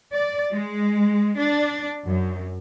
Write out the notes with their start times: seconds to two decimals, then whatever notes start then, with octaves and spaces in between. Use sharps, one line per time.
0.12 D5
0.52 G#3
1.39 D4
2.06 F#2